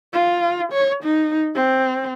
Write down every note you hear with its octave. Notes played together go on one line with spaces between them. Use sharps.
F4
C#5
D#4
C4